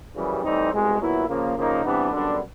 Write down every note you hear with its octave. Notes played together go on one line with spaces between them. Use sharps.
F#2 C#3 E3 G3
A2 E3 G3 C4 D#4
C2 B2 G#3
A#2 F#3 B3 E4
C#3 F3 A#3
C#3 F3 A#3 D#4
C3 E3 G3 B3 D4
F#2 D3 G3 B3 D4